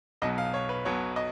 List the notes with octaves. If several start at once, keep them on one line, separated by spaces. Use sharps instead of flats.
B1 B2 F#3 D#5
F5
C#5
B4
B1 B2 F#3 C#5
D#5